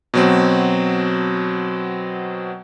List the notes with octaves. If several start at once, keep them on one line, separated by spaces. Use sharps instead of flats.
B2 F#3 C4